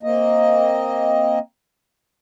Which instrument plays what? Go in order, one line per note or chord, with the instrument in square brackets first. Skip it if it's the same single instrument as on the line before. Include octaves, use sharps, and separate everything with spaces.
[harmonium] A#3 C4 D#5